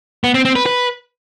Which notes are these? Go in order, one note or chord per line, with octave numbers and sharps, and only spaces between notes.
B3
C4
C4
B4
B4